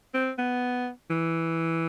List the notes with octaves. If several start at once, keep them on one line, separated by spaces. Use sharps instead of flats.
C4
B3
E3